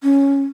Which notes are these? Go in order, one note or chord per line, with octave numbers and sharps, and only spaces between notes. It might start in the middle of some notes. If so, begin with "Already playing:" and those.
C#4